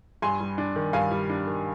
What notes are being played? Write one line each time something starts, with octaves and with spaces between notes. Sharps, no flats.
G2 G#5 C6
G3
D4
D#3
G2 F5 G#5
G3
D4
D#3